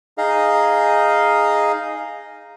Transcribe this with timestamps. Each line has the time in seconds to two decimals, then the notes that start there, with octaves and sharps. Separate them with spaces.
0.18 D#4 G#4 D#5 F5